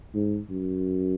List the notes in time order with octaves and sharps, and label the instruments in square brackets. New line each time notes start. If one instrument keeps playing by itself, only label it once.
[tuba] G#2
F#2